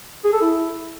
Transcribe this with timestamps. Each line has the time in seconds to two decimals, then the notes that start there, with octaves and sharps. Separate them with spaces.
0.24 G#4
0.33 A4
0.41 E4